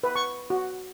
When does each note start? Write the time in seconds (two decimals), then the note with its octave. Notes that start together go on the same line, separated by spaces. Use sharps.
0.03 B4
0.15 C#6
0.50 F#4